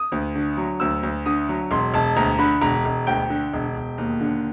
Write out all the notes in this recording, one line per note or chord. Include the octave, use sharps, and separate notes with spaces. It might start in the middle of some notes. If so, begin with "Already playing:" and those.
Already playing: D#6
D2
D3
F#3
D2 E6
D2
D3 D#6
F#3
E1 C6
E1 A5
D2 A#5
D3 B5
E1 A#5
E1
D2 G5
D3
E1
E1
D#2
D3